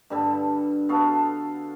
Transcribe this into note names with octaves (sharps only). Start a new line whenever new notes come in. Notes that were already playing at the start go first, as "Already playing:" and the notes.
G2 D3 G3 A4
B3 F#4 A4 F5